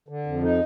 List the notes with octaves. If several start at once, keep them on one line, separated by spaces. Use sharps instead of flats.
D3
F2
D#4